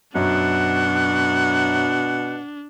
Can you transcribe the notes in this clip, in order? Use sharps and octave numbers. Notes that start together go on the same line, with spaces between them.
F#2 B2 D4 F#5